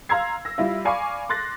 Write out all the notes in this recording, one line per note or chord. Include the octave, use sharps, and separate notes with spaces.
F5 A#5 C6 E6 G#6 C7
E6 A#6
G3 E4 F4
D5 F5 G#5 B5 C#6 D6
C6 F#6 A6 A#6